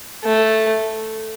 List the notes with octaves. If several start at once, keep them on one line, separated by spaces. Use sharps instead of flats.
A3